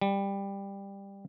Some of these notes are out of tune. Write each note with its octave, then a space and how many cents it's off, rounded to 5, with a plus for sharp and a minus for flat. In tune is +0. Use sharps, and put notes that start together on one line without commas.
G3 +15